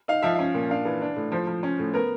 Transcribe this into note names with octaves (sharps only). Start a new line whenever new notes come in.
D#4 F5
F3 E5
C#4 F5
A#2
D4 F5
E3
D4
A2
F3 C5
F3
C#4
A2
B3 A#4